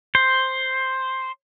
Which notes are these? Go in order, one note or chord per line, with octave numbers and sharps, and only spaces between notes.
C5